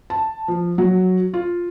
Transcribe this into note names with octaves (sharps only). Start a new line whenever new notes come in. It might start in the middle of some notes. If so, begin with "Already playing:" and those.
A5
F3
F#3
F4